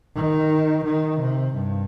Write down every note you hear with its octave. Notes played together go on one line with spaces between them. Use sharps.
D#3
D#3
C3
G2